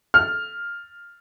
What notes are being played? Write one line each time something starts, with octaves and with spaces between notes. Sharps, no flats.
F6